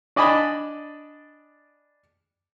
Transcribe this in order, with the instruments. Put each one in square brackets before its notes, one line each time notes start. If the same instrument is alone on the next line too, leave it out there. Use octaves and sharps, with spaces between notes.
[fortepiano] D4 D5 D#5 G#5 A5 B5